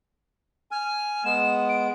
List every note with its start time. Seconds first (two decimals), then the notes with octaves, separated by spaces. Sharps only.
0.71 G#5 F6
1.24 G#3 B3 E7
1.69 D7